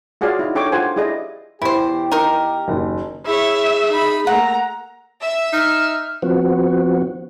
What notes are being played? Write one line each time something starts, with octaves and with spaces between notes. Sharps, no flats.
F4 F#4 G#4 C#5 D5 F5
D#4 E4
D4 A4 C#5 G5 C#6 D6
F4 G4 C5 F#5 G#5
E4 G4 G#4 D5 D#5
E2 E4 G4 C5
D#4 A#4
F#1 D#2
E4 G#4 C#5 E5
D#4 B5
A3 A#3 F#5 A#5
E5
D#4 F6
F3 B3 C4 F#4